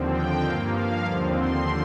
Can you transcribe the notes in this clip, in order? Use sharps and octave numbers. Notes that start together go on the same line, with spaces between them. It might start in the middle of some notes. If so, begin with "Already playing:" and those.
Already playing: D#2 D3 F3 C4
G5
G2 F3 A#3 F5
F5
D#2 D3 F3 C4
C6